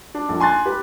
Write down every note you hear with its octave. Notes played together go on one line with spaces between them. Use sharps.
D4
A#1
G#5 C6 F#6 A6
G4 B4